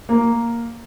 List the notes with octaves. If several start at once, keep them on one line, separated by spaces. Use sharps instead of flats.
A#3